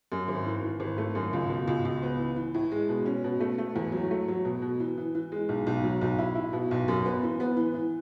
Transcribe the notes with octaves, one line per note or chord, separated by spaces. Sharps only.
F#2
G#1
E3
E3
G#1
A3
F#2
C#2
B2
C#2
C#2
B3
E3
E3
A2
G#3
B2
C#4
B2
A3
A3
E2
F#3
A3
F#3
B2
B2
E3
E3
E3
G#3
B1
B1
F#3
B1
E4
E4
B2
B1
F#2
B3
E3
B3
E3
E3